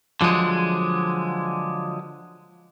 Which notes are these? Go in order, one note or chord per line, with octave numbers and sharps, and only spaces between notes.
D3 F3 F#3 G#3